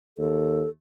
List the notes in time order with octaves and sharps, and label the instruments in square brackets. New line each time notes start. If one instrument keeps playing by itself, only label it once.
[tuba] D#2 [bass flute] A4